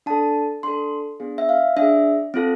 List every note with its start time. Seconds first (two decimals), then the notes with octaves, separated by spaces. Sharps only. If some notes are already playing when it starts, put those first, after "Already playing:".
0.06 D4 A4 A5
0.63 D4 A4 C6
1.20 B3 D4 G#4
1.38 E5
1.49 F5
1.76 D4 E5
1.82 G#4
2.34 C4 F4 A4